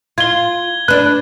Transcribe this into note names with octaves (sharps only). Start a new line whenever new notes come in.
F4 G#6 G7
D4 B4 F#6